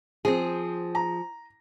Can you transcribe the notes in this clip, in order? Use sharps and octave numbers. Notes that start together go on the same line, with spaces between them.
F3 C4 G#4
A#5